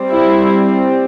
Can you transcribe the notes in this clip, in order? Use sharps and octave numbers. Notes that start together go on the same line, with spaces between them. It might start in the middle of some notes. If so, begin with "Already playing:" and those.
Already playing: G3 C4
E4